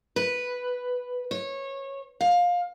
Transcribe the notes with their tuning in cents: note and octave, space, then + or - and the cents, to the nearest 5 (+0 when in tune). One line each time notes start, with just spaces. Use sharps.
B4 +0
C#5 -20
F5 +20